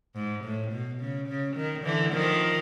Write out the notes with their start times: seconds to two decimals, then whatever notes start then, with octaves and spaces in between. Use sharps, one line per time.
0.15 G#2
0.44 A2
0.71 B2
1.01 C#3
1.28 C#3
1.56 D#3
1.85 D3 E3
2.13 D#3 F3